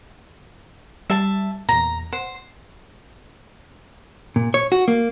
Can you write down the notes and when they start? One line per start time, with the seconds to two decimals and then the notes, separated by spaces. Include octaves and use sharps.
1.10 G3 E5 A5
1.69 E2 A#2 A#5
2.12 C5 F#5
4.36 A#2
4.54 C#5
4.72 F#4
4.88 A#3